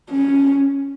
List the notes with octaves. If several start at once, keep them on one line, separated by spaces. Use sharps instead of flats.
C#4